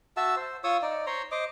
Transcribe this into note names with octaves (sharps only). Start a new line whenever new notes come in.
F#4 E5 A5 E6
C5
F4 C#5 D#6 E6
D#4 D5
C5 C#5 A#5 C6
C5 D#5 D6